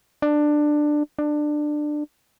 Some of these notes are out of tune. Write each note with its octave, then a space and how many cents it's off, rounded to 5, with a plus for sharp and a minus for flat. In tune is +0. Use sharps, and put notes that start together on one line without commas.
D4 +15
D4 +20